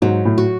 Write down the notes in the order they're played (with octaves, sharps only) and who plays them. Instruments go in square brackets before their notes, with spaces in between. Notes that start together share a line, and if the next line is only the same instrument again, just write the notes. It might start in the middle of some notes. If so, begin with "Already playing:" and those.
[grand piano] G#2 [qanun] F#3
[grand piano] A2
[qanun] F#4